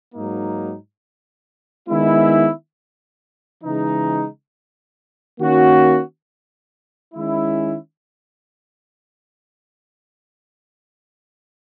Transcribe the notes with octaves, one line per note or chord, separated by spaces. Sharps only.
G#2 F#3 A#3 D#4
D#3 G#3 B3 E4
C#3 E3 G#3 D#4
D#3 A#3 C#4 F#4
D#3 G#3 C#4 E4